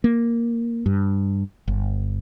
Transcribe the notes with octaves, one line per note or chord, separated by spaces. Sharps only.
A#3
G2
G1